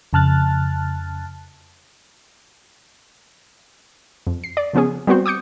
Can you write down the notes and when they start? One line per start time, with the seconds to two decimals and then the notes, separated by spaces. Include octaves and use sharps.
0.13 F2 C#3 A5 F6 F#6 A6
4.27 F2
4.44 C7
4.57 D5
4.73 C#3 F3 B3 C#4 G#4
5.07 G3 B3 C4 F#4 C5
5.26 D6 D#6 G6 C#7